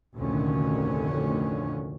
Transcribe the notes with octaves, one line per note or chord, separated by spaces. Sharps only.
F1 D2 A#2 D3 D#3 C#4